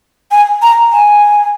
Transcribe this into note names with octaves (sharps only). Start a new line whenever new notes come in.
G#5
A#5
G#5